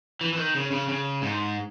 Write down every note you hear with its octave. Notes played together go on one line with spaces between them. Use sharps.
E3
E3
D#3
C#3
C#3
C#3
G#2